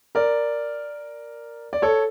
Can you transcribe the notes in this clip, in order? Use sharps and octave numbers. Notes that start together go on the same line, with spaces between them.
A#4 D5
D5
A4 C#5